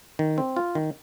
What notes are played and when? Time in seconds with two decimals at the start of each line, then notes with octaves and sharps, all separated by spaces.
0.19 D#3
0.38 C4
0.57 F4
0.75 D#3